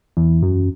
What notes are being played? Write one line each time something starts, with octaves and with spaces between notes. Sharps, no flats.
E2
F#2